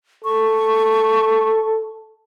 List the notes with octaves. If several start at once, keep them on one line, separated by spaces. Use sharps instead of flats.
A4 C#6